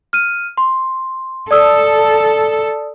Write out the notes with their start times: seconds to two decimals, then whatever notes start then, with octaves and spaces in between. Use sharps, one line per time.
0.13 F6 D#7
0.58 C6
1.51 A4 D5 D#6 E6